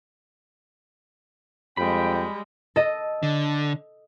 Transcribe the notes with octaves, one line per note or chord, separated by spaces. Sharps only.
F2 G3 G#3 G5 B5
A4 D#5
D3